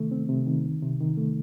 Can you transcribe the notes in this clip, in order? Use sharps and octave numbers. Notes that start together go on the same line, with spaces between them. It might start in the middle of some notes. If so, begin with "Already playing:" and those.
Already playing: C3 D#3 A3
C4
C3
D#3
C2
C3
D#3
A3